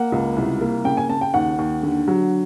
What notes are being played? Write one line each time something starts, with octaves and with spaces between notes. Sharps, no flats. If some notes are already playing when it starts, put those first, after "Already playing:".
Already playing: A#3 F#5
C#2
C2
A#3
C#3 G5
G#5
C#3 A5
G5
D#2 F#5
D#2
D3
F#3